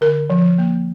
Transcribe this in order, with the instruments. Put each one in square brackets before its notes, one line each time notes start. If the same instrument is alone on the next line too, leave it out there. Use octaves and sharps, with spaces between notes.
[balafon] D3 A#4
F3
A#3